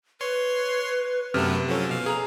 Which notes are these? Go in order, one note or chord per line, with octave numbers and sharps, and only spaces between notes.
B4 C#5 C6
F#2 C3 A3 B3 F6
F3 F#3 C#4 A4
B2 F5
G#4 A#5